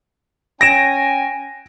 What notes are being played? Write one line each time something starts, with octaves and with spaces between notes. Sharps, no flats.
C#4 G5 G#5 A#6 D7 E7